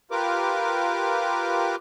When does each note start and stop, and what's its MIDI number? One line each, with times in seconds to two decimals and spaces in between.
0.11 1.76 65
0.11 1.76 67
0.11 1.76 70
0.11 1.76 71
0.11 1.76 86